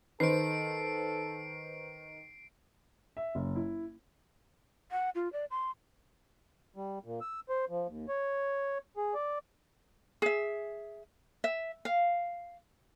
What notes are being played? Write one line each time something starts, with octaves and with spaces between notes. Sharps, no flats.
D#3 A4 B4 C5 C7 D7
E5
F#1
E4
F#5
F4
D5
C6
G3
A#2
E6
C5
F3
D#2
C#5
G#4
D5
G#4 E5
E5
F5